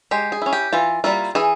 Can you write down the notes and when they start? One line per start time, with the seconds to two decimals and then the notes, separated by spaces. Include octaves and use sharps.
0.11 G#3 G4
0.32 G#4
0.42 C#4 E4
0.53 G4
0.73 E3 F4
1.04 G3 A#3 E4 F4
1.35 E3 G#4